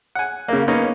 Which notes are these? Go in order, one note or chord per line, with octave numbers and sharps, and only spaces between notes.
F#5 G#5
C#3 A#3
A#3 B3 C#4 D#4